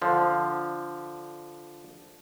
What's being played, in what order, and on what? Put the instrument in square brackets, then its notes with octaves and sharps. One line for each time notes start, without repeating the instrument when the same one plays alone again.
[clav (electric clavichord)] D3 F3